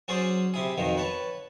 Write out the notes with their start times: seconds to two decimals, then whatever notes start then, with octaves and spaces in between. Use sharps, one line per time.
0.08 F#3 C#4 G#4 C5 D5
0.54 C3 E4 G#4
0.78 F2 B2 D#3 F3
0.97 B4 C#5 A5